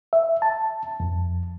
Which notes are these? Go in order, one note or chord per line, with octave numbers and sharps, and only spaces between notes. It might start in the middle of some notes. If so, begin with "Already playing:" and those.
E5
A5
F2